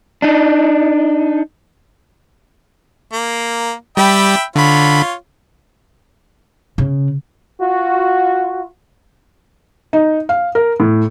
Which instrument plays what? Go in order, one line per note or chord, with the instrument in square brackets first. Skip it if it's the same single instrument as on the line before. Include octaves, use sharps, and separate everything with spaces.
[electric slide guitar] D4 D#4
[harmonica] A#3
[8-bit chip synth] G3 G4 [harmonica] E5 G5 B5
[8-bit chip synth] D3 B5 [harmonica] F4 C#5
[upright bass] C#3
[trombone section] F4 F#4
[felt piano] D#4
F5
A#4
A2